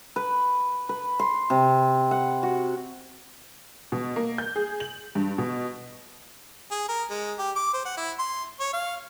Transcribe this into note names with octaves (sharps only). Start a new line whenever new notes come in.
B4
B4
C6
C3
F#5
F#4
B2
A#3
G6
G#4
F#7
G2
B2
G#4
A#4
G#3
G4
D6
C5
F#5
E4
C6
C#5
F5